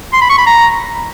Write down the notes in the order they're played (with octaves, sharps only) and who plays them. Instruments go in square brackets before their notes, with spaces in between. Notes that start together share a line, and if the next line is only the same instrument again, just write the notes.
[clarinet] C6
B5
C#6
B5
A#5